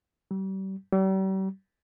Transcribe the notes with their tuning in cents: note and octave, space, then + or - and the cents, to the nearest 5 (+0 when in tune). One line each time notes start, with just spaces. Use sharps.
G3 -35
G3 -40